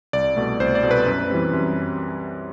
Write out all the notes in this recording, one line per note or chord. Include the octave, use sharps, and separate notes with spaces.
C2 D5
B2 A3
C2 C5
D5
B2 A3
B4
F#2
E3 G3 C4
F#2